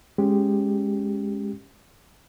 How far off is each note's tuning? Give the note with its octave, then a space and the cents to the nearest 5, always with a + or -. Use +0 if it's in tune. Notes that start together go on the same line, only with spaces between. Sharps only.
G#3 +0 C#4 +0 G4 +0